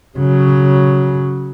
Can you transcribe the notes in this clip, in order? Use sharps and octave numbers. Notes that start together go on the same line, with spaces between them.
C#3 F#3